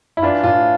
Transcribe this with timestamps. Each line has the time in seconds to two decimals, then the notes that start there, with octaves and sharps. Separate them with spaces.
0.17 E4
0.22 E3 D4 F4
0.43 A2 D4 F4